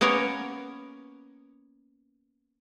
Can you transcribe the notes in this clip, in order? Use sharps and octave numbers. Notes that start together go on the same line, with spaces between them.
A#3 B3 C#4 A#4 C#5